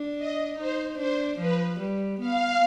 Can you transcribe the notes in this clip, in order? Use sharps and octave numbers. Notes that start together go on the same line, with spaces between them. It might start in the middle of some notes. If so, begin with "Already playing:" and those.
Already playing: D4
D#5
D#4 C5
D4 C5
F3 B4
G3
B3 F5